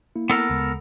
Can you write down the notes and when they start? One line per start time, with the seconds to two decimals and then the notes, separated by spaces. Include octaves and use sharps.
0.16 A#3 E4
0.30 B3 A4 A#4
0.49 D2 C#3 G#3